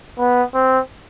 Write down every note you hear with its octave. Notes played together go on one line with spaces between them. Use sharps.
B3
C4